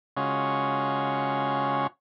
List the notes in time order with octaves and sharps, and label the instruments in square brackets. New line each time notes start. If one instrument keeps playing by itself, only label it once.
[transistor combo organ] C#3 G#3 C#4 F4 F#4 C#5